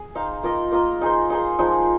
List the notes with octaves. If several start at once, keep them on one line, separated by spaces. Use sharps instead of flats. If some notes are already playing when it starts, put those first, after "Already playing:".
Already playing: G#4
D#4 C5 F5
A#3 F4 A#4 D#5
A#3 F4 A#4 D#5
D#4 G#4 C5
D#4 G#4 C5
F3 G#3 D#4